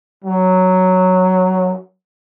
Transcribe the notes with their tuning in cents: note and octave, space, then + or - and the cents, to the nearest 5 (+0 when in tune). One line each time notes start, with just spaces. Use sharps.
F#3 +0